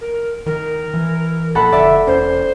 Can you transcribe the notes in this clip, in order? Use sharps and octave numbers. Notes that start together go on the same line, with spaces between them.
A#4
D#3 A#4
E3
A#1 A4 F#5 B5
F1 D3 D5 E5
E1 C#4 C5